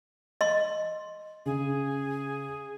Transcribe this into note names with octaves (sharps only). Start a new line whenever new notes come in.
D#5 C6
C#3 G#4